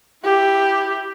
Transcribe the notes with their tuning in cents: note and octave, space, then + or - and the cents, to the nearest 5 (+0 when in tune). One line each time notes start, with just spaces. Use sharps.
E4 +0 G4 +0